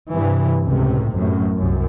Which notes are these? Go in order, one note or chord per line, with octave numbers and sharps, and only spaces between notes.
G2 C3 E3
C#2 A2 C3
A1 F#2 A2
C2 F#2